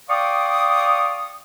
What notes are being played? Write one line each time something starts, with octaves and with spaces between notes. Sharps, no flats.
D5 F5 G5 C#6 D#6